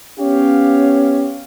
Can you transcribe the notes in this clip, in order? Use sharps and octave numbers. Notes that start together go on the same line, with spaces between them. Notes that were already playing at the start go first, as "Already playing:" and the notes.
B3 C#4 G4 C#5 F5